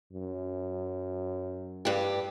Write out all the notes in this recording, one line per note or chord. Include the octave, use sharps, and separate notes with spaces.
F#2
G2 G4